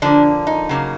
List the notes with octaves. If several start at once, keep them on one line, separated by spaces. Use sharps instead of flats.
D3 F3 A#3 D4
D#4
C#3 F#3 A#3